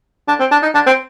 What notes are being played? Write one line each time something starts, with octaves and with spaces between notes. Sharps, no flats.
D4
C4
D4
D#4
D4
C4